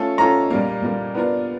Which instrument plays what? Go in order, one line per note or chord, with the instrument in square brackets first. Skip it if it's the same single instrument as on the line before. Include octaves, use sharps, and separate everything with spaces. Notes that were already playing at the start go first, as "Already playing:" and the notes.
Already playing: [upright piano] A3 C#4 F4 A4
[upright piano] A3 C#4 F4 A4 [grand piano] A#5
[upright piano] A#2 G3 A#3
A#2 G3 A#3
B3 D4 F4 A#4 D5